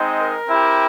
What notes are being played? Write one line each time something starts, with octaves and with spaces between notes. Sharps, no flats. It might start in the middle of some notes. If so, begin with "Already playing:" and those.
Already playing: G#3 C4 D#4
A#4
C4 E4 G4